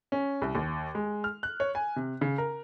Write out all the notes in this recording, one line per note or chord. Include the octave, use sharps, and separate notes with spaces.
C#4
C2
D#2
G#3
F6
F#6
C#5
G#5
C3
C#3
A#4